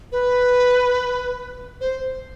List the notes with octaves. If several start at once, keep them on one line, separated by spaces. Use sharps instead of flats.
B4
C5